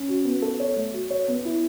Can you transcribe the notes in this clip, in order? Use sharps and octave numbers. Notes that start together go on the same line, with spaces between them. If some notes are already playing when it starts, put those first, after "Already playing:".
Already playing: C#4
F#4
B3
A4
C#5
A3
F#4
C#5
B3
E4